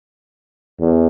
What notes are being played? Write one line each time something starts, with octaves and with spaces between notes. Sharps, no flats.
E2